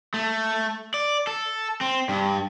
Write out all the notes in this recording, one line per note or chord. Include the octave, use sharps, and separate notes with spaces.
A3
D5
A4
C4
G2